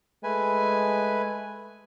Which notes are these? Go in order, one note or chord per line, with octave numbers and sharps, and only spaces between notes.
G#3 A3 B4 G#5